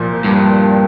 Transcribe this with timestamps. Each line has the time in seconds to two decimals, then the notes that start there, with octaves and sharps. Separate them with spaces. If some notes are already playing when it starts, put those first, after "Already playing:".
Already playing: C2 A#2 F3
0.24 G2